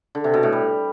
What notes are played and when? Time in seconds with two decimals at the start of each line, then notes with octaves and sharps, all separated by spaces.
0.15 D3
0.24 C3
0.34 B2
0.43 A2
0.52 G3